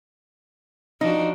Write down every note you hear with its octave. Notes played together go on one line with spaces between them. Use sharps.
F3 D4 D#4 F#4